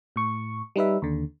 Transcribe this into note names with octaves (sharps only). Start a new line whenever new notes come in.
A2 C#6
G3 D#4 B4 E5
D#2 D3